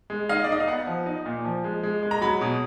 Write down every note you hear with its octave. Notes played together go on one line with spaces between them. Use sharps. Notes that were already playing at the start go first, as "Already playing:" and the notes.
G#3
D#4 F5
D5
D#4 D#5
F5
B3 F#5
F3
D#4
A#2
F3
G#3
G#3
G#3
A#5
F#3 B5
B2